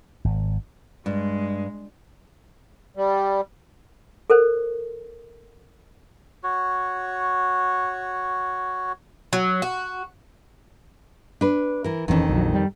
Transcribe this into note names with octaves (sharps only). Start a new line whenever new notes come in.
G#1
G2 G#3
G3
A4 A#4 C5
F#4 C#5
F#3
F#4
D4 B4
E3 A#4
D#1 F2 D#3 E3 C#4
A#1 F#3
G3